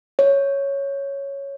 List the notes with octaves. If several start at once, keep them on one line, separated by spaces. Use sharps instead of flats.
C#5